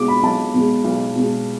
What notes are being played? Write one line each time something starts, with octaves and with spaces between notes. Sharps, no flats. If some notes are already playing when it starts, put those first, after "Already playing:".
Already playing: B1 B2 G#3 D6
B5
B1 A5
B2 G#3
B1
B2 G#3